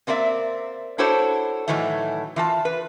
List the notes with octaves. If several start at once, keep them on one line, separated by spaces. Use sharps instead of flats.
A#3 C4 A#4 D5 E5
D4 E4 F#4 A4 C5 C#5
A2 D#3 E3 F#3 A3
E3 F4 A5
B4